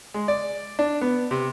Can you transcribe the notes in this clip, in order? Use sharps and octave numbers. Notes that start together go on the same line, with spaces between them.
G#3
D5
D4
B3
C3